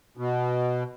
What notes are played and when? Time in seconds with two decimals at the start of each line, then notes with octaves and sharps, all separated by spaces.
0.17 B2